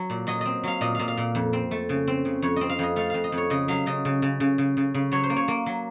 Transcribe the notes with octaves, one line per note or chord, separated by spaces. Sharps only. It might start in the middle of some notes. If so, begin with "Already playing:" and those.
Already playing: F#3
A#2
F#3 D#5
C4 D#5
F#3 F5
A#2 D#5
A#2 F5
F5
A#2
F2
C4
A3
C#3
C4
C#3
F2 C#5
C4 D#5
F5
F2 D#5
A3 F5
F2 F5
D#5
F2
C#5
C#3 D#5
F#3 F5
C#3 D#5
C#3
C#3
C#3
C#3
C#3
C#3
F#3 C#5
C5
A#3
C#5
A#3
F#3